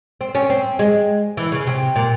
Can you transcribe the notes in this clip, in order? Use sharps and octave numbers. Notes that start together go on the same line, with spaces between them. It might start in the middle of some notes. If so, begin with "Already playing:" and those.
C4
C#4
C4
G#3
E3
C#3
C3
A#2